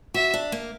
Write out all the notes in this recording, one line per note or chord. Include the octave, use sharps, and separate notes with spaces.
F#4 E5
D4
A#3